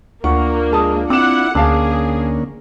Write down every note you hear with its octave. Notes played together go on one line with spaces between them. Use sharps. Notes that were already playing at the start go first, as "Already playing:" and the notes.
D2 A#3 D4 F4 F#5 C#6
G#3 A5 D#6
C4 E4 F#5 D6 E7
D2 D3 A#3 C#4 G#4 F5 A5 D6